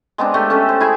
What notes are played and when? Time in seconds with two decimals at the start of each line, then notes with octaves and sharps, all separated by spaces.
0.18 G#3 B3 C4 D4
0.34 G#3 A3 G4
0.50 C#4 A4 E5
0.69 C5
0.80 E4 G#4 E5